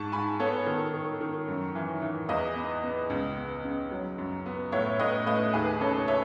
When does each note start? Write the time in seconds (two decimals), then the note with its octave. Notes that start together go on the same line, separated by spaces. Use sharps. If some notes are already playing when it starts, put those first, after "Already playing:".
Already playing: G#2 A5 C#6
0.12 G#2 G#5 B5
0.39 B3 A4 C#5
0.66 D#3
0.94 D#3
1.21 D#3
1.48 F#2
1.75 E3
2.02 E3
2.29 E2 B4 D#5
2.56 B3
2.83 B3
3.10 C#2
3.37 B3
3.64 C#3
3.91 F#3
4.18 F#2
4.46 B3
4.72 A2 C#5 E5
4.99 A2 B4 D#5
5.26 A3 B4 D#5
5.53 D#2 G#4 B4
5.81 C#3 A4 C#5
6.08 C#5 E5